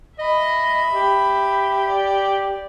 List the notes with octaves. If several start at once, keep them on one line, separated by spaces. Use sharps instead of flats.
D#5 E5 B5
G4
D5